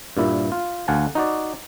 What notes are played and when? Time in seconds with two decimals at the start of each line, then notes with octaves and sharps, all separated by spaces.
0.17 G2 A#2 E4
0.52 F4
0.88 D2 F5 F#5 G#5 A5
1.15 D#4 F#4 D5